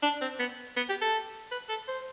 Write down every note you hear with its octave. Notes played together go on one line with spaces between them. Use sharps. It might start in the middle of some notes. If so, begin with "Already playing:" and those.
D4
C4
B3
B3
G4
A4
B4
A4
C5